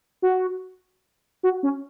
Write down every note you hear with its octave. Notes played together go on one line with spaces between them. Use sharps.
F#4
F#4
C#4